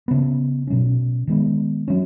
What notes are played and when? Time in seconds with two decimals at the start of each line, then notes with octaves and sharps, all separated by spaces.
0.08 C#3 B3
0.67 B2 F#3 C#4
1.27 D#3 G#3 B3
1.88 F#3 C#4